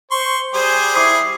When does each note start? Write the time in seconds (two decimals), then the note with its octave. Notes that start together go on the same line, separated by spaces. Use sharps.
0.11 C5 C6 C#6
0.54 G3 G#4 C5 G#5
0.96 E4 D6 D#6 C7